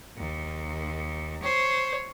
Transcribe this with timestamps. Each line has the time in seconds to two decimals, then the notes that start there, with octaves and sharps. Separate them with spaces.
0.17 D#2
1.43 C5 C#5